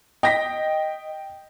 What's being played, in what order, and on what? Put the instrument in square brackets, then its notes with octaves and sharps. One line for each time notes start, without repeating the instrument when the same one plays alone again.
[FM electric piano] D#5 [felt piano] G5 A#6 B6